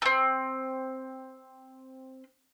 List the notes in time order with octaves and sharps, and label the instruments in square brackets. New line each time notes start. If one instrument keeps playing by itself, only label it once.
[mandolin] A3 C4